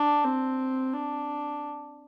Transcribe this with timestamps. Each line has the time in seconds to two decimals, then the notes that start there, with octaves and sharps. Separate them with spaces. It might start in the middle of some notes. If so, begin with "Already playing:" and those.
Already playing: D4
0.24 C4
0.94 D4